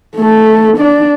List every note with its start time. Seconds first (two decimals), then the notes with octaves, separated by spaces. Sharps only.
0.16 A3 A4
0.77 D4 D5